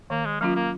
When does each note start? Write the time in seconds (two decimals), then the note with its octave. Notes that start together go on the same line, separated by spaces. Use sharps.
0.10 D#3 A#3
0.26 G#3
0.41 F#3 A#3 C#4 F4
0.56 A#3